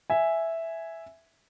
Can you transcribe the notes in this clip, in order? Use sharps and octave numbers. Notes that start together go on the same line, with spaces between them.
E5 G#5